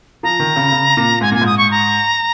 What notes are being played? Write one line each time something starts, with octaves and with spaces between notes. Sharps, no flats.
F3 A#5
D#3
C#3
C#3
A#2
G#2 G#5
A#2 G#5
G#2 D#6
C#6
A#5